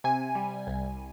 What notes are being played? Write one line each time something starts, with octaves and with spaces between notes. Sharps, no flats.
C3 G#5
G3
C2